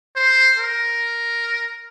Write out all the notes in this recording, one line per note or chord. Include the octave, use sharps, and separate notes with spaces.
C5
A#4